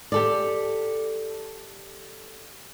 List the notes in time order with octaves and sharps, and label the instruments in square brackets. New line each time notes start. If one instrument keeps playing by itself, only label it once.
[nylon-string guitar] G4 A4 D5